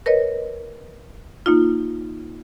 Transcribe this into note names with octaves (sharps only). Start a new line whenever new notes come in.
A#4 B4 C#5 D#5
A#3 D#4 F4